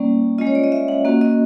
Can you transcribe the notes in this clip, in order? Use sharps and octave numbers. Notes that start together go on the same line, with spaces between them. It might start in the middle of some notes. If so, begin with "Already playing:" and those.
Already playing: G3 A#3 C#4 D5
G#3 C#4 F4 D#5
C#5
D5
D#5
E5
F#5
A#3 C#4 F#4
D#5